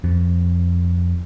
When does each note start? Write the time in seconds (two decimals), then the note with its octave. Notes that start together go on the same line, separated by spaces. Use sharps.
0.04 F2